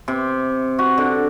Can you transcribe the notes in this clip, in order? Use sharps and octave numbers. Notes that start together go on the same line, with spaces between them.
C3
F#4
D3